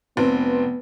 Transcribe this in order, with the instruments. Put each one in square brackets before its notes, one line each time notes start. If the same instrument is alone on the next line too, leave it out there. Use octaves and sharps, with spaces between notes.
[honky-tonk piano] F1 C4 [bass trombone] B3